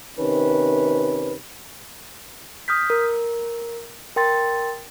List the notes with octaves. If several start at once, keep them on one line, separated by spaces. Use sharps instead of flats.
C3 D#3 C#4 B4
D#6 F6 G6 B6
A#4
A#4 G5 C6 A6